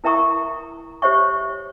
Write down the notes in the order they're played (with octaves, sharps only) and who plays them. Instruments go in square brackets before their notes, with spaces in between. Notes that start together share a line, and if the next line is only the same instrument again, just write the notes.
[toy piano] E4 A#4 E5 A#5 C#6 D#6
G4 C5 C#5 E5 C#6